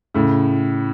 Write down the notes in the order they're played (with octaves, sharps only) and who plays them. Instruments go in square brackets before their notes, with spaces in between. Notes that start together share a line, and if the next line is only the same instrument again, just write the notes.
[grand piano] A2 C#3